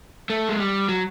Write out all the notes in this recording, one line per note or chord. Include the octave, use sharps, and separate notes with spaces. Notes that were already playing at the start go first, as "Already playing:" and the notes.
A3
G#3
G3
F#3